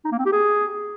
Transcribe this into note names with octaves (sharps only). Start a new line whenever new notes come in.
D#4
A#3
C4
G4
G#4